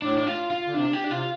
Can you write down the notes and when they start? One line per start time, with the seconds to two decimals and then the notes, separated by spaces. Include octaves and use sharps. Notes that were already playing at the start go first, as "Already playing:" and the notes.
0.02 A2 D4
0.18 D4
0.27 F4
0.51 F4
0.67 D3
0.74 C3 D4
0.93 G4
1.04 D4
1.10 C3 F4